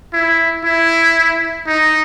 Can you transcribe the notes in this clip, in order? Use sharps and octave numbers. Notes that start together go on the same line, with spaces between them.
E4
E4
D#4